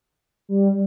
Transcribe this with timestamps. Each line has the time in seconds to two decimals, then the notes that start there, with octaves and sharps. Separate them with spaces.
0.49 G3